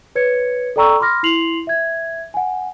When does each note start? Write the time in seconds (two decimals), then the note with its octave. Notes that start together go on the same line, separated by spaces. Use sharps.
0.15 B4 C#5 G#6 C#7
0.76 A4 D5 G5 A#5 C#6 E6
1.00 B5 C6 D6 F6 A#6
1.23 E4 C6 C7 F7 F#7
1.67 E5 G#6
2.34 F#5 G#5